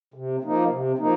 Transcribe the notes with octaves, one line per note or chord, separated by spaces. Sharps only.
C3
F3 A#3 D#4
C3
F3 A#3 D#4